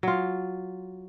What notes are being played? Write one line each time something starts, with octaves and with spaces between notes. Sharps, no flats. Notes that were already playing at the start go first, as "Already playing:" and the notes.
F#3 F4